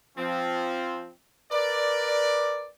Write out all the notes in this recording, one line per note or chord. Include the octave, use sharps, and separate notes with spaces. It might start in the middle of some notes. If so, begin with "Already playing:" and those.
F3 C4
A#4 B4 D5